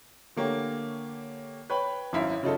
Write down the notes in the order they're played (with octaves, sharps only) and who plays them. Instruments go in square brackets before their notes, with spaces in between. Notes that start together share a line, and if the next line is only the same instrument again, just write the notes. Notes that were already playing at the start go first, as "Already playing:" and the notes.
[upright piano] D3 A3 A#3 G4 C#5
B4 C#5 G5 B5
G#1 F#2 E4 F5 B6
C#3 F#3 D#4 F4 A4